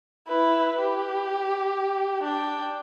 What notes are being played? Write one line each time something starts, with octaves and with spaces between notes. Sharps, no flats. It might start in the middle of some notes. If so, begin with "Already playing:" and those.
E4 B4
G4
D4 G5